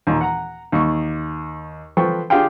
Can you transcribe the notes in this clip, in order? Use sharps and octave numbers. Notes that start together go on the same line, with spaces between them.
D#2 A#2
F#5 A#5
D#2 C#6
F3 A4 B4 C5 G5 C#6
D4 F4 G4 G#4 F5 G5